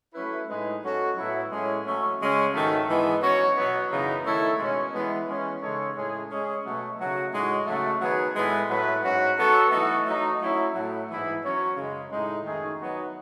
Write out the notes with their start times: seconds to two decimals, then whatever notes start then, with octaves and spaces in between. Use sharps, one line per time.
0.14 F#3 A3 C#4 E4 B4
0.47 A2 G#3 D#4 G#4 B4
0.81 F#3 C#4 F#4 A4 C#5
1.16 A2 F#3 B3 E4
1.50 A2 G#3 C#4 G#4 C#5
1.85 F#3 A3 C#4
2.19 C#3 G#3 C#4
2.53 G#2 D#3 F#3 A3
2.87 G#2 E3 G#3 B3
3.21 F#3 C#4 F#4 C#5
3.56 B2 F#3 B3
3.90 F#2 C#3 E3 B3 D#4
4.24 D#3 A3 E4 A4 C#5
4.58 B2 G#3 C#4
4.93 E3 G#3 B3
5.26 E3 G#3 C#4
5.60 C#3 G#3 D#4 A4 C#5
5.95 A2 G#3 C#4 G#4
6.29 G#3 C#4 G#4
6.64 B2 F#3 A3
6.97 C#3 F#3 A3 D#4 F#4
7.32 A2 G#3 D#4 F#4 C#5
7.66 C#3 F#3 A3
8.00 D#3 F#3 B3 D#4 G#4
8.35 A2 G#3 B3 E4 B4
8.68 A2 F#3 A3 E4 B4
9.03 G#2 F#3 C#4 F#4
9.37 F#3 B3 F#4 A4
9.71 E3 A3 D#4 F#4
10.06 F#3 A3 D#4
10.39 F#3 A3 C#4 E4
10.74 A2 F#3 A3
11.08 G#2 E3 B3 E4
11.42 F#3 C#4 F#4 C#5
11.76 F#2 C#3 G#3
12.11 A2 G#3 D#4
12.45 F#2 D#3 A3 D#4 G#4
12.79 F#3 B3 D#4 F#4